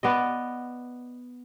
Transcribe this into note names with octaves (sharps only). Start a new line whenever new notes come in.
B3 D5 D#5